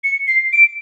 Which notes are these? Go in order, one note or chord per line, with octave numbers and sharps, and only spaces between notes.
C#7
C7
D7